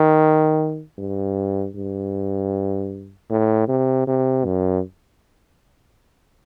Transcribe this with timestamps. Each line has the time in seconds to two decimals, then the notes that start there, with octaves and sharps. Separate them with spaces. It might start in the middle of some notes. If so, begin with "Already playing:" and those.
Already playing: D#3
0.99 G2
1.76 G2
3.30 A2
3.68 C3
4.07 C3
4.45 F#2